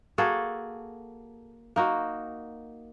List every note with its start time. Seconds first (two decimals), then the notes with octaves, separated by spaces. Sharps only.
0.18 A#3 F#4 G#4 A4
1.76 A#3 D#4 F#4